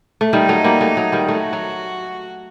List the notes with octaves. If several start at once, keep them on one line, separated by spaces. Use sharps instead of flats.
A3
D#3 G3 D#4
F#3 A3
G3 A#3
F#3 A3
F#3
D#3 G3
F#3 A3 F#4
F#3